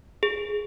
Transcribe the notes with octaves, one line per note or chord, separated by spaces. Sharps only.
G#4